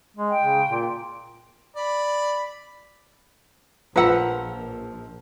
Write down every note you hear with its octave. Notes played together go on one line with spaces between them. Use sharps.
G#3
G5
C#3
A#2
D5 B5
A#1 F3 B4 F#5 A#5 E6